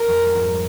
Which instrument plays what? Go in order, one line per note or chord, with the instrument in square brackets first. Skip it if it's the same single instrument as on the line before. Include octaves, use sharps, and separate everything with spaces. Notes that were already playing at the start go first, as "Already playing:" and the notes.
Already playing: [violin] A#4
[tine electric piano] F2 F3
G#2 G#3
F2 F3
G3